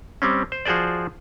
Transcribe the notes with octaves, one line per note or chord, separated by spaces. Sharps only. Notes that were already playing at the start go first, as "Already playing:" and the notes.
G3 C4 C#4
C5
F3 F#4 G#4 C5 D5